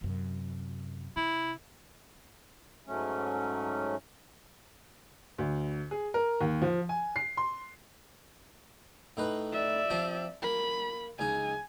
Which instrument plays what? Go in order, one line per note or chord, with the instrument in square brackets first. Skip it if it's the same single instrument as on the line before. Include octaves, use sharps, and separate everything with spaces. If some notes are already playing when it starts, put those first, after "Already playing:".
[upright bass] F#2 C3
[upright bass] C3 [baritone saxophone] E4
[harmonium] G#2 F#3 A3 C#4
[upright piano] D2
G#4
A#4
D#2
F3
G#5
C7
C6
[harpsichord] A2 D#4 B4
[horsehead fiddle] D5 E5
[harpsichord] F3 C4 G4
[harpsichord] A#3 [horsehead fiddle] B5
[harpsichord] C#2 D#4 D#6 [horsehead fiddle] G#5